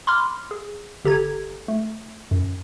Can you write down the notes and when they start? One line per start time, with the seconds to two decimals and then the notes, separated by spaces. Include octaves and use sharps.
0.07 B5 C6 D6 F6
0.51 G#4
1.05 G1 G4 A4 A#5 G#6
1.68 A3
2.31 F#2